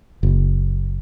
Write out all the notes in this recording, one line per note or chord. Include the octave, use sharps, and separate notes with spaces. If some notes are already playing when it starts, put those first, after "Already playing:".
F#1